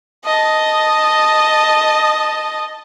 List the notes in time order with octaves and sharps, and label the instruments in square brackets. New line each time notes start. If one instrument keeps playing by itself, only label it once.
[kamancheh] D#5 A5